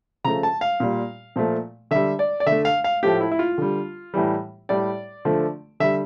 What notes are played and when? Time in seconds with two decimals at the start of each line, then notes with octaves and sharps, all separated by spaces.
0.24 C#3 F3 A3 A#5
0.43 A5
0.61 F5
0.80 A#2 G3
1.36 A#2 F3 A3
1.91 D3 G3 E5
2.19 D5
2.40 D5
2.46 D3 A3 E5
2.65 F5
2.84 F5
3.03 A2 F3 A3 G4
3.21 E4
3.32 E4
3.39 F4
3.58 D3 G3
4.14 A2 E3 G3
4.69 A2 G3 D5
5.25 D3 F3 A3
5.80 D3 G3 E5